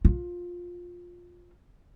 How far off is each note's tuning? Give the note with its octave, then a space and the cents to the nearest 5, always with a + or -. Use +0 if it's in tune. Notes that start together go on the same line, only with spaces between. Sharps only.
F4 +15